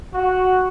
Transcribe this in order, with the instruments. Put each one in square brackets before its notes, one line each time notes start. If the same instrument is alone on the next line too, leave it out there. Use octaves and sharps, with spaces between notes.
[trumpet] F#4